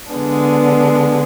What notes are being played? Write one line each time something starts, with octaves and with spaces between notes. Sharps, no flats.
D3 G#3 B3 D4